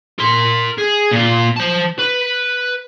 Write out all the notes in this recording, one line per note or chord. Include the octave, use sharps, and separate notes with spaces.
A#4 C6
G#4
A#2 F4
C5 A5
B4